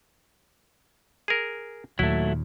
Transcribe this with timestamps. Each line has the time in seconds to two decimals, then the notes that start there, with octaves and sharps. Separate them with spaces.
1.28 G#4 A#4
1.99 D#2 A#2 F#3 A3 E4